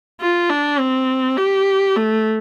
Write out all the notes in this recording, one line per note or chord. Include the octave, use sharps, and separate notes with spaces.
F4
D4
C4
G4
A3